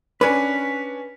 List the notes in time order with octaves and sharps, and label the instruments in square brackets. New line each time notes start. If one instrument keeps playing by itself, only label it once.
[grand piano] C#4 D4 [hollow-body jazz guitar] B4 [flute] B6